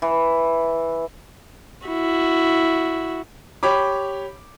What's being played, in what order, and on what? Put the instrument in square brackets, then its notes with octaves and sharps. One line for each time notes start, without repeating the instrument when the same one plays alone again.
[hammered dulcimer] E3
[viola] E4 F#4
[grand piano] G4 C#5 B5 D6